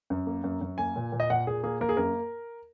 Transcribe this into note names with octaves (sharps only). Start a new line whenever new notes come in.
F#2
A#3
F#2
F#2
A#3 G#5
A#2
A#2
D#5
A#2 F#5
A#2 G#4
A#3 G#4
A#3 A#4
G#4
F#2 A#4